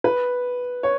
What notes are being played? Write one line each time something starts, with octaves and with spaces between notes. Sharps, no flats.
B4
C#5